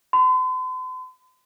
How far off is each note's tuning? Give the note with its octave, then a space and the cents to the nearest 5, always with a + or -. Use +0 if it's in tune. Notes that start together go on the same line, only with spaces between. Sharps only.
C6 -45